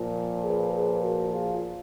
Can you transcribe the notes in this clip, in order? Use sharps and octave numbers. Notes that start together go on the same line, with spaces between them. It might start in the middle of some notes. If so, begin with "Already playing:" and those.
Already playing: A#2 F3
G#4 B4
G#4 B4
F#4 A#4
F4 G#4